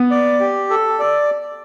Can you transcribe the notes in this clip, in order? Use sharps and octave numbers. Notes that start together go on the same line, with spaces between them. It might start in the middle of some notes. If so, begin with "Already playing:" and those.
Already playing: B3
D5
G4
A4
D5